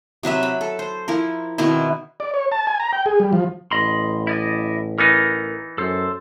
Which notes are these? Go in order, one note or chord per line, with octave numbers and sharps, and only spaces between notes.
C3 F#3 B4 E5
B5
A4
C5
F3 E4 A#4
B2 D#3 C4 E4
D5
C#5
A5
G#5
A#5
G5
G#4
G3
F3
A1 D#5 B5 C6
E4 D5 D#5
E3 B3 D#4 A#4
F#2 A4 C5